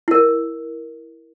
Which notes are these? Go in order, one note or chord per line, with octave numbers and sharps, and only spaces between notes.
E4 A#4